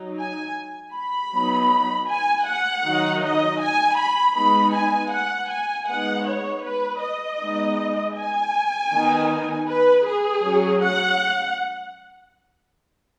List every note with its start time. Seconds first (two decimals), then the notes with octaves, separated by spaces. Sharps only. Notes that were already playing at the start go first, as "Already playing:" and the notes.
Already playing: F#3 D#4
0.18 G#5
0.95 B5
1.32 F#3 B3 D#4
2.09 G#5
2.47 F#5
2.85 D#3 F#3 D#4
3.23 D#5
3.61 G#5
3.98 B5
4.36 G#3 B3 D#4 B5
4.75 G#5
5.12 F#5
5.51 G#5
5.88 G#3 B3 D#4 F#5
6.27 C#5
6.64 B4
7.03 D#5
7.40 G#3 B3 D#4
8.16 G#5
8.93 D#3 B3 D#4
9.68 B4
10.06 G#4
10.44 F#3 C#4
10.82 F#5